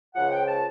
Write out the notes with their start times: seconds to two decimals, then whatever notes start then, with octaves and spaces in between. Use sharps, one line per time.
0.14 C#2 C#3 F3 F#5
0.30 G5
0.48 A5